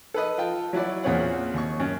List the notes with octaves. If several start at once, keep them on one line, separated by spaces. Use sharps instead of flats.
A4 B4 D#5
F4 G5 A5
F#3 E4 F#4 D5
E2 A#2 C4 C#4 C#5 F#5
D#2 C#6
F#2